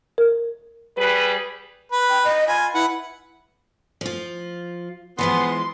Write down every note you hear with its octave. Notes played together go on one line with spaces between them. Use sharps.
A#4
G3 G#4 B4
B4
G5
D#5
F4 G#5 B5
E4 B4 F#5
F3 F4
E3 F3 G#3 B3 C6